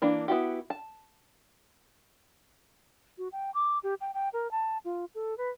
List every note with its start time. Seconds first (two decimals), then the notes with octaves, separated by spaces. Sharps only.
0.02 E3 A#3 D4
0.28 B3 E4 F#4 G4
0.70 A5
3.18 F#4
3.32 G5
3.54 D6
3.83 G4
4.01 G5
4.14 G5
4.33 A#4
4.51 A5
4.85 F4
5.15 A4
5.38 B4